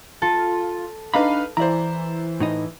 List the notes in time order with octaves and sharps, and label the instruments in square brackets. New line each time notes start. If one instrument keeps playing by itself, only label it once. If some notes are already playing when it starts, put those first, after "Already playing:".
[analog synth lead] F4 [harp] A4
[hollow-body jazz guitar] D4 A#5 B5 [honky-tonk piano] D#4 B4 [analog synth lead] F5
[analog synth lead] E3 [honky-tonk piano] E4 C5 [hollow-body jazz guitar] D5 A#5
[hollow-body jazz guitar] A2 D#4 D#5